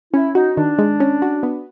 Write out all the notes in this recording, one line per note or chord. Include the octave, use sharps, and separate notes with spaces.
C#4 E4
D#4 F#4
D#3 D4
G#3
C#4
F#4
B3